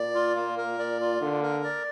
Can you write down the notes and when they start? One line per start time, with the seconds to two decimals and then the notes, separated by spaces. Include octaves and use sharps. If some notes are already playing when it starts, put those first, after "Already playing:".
Already playing: A#2 D5
0.15 F4
0.36 A#3
0.58 A#4
0.79 D5
1.00 F4
1.21 D3 A#3
1.43 A#4
1.64 D5